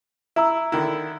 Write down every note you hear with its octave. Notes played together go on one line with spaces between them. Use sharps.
E4 E5 A#5 E6
D3 D#3 E4